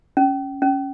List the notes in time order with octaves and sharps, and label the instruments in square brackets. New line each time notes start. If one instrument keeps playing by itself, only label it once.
[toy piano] C#4
C#4